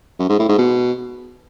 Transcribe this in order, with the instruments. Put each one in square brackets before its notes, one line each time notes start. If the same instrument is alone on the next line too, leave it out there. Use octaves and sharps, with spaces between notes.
[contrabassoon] F#2
G#2
A2
G#2
B2